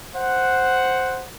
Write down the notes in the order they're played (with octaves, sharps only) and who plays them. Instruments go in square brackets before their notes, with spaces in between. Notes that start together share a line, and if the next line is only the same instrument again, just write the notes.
[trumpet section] C5 F#5